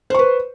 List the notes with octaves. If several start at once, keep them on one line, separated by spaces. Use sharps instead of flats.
B4 C5 C#6